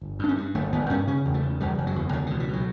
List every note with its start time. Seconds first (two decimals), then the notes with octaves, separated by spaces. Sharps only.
0.02 G1
0.19 G2 D4
0.28 C#4
0.37 G2
0.54 G1 A3
0.72 G1 B3
0.90 G2 C#4
1.07 C#3 C#4
1.25 E2
1.34 A3
1.43 C#3
1.60 E2 G3
1.78 F#1
1.87 F#3
1.96 E2
2.13 C#2 D3
2.26 D3
2.30 B2
2.40 E3
2.48 B2 F#3